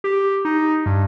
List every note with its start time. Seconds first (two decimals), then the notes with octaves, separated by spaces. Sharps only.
0.04 G4
0.45 D#4
0.86 G2